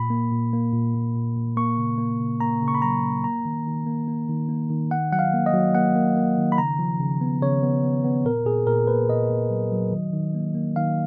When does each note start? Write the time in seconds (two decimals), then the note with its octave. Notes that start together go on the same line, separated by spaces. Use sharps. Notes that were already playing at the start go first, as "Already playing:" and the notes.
Already playing: A#2 B5
0.10 A#3
0.31 A#2
0.53 A#3
0.73 A#2
0.95 A#2
1.15 A#2
1.36 A#2
1.57 A#3 C#6
1.78 C#3
1.98 A#3
2.19 C#3
2.41 A#3 A#5
2.62 C#3
2.68 C#6
2.75 B5
2.82 F#3 A#5
3.03 A#3
3.24 A#3 A#5
3.45 D#3
3.66 D#3
3.86 A#3
4.08 A#3
4.29 D#3
4.49 A#3
4.70 D#3
4.91 D#3 F#5
5.12 F#3 F#5
5.19 F5
5.33 A#3
5.46 D#5
5.54 F#3
5.75 A#3 F#5
5.96 A#3
6.16 A#3
6.38 D#3
6.52 B5
6.58 C#3 A#5
6.79 F3
6.99 C#3
7.21 B3
7.42 C#3 C#5
7.63 B3
7.84 B3
8.04 B3
8.25 A#2 A#4
8.46 A#2 G#4
8.67 A#2 A#4
8.87 A#3 B4
9.09 A#2 D#5
9.30 A#2
9.50 F#3
9.72 F#3
9.92 D#3
10.13 D#3
10.35 A#3
10.55 A#3
10.76 D#3 F5